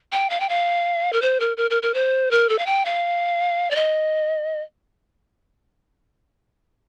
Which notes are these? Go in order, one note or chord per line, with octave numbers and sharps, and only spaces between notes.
G5
F5
G5
F5
A#4
C5
A#4
A#4
A#4
A#4
C5
A#4
A4
F5
G5
F5
D5
D#5